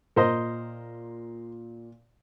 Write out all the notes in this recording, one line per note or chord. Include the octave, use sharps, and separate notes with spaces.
A#2 A#4 C5 D#5